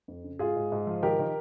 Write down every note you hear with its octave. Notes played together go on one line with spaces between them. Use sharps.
F2
C#3
G#2 F4 G#4
G#2
G#2
F3
D#3 G4 A#4
D#3